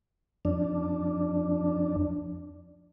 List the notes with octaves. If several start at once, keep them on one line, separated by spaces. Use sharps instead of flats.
F2 D4